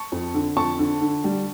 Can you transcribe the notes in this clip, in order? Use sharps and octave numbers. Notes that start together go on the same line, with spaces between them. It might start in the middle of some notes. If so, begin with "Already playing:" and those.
Already playing: A5 C#6
F2
D3
F2 A5 C#6
D3
D3
G3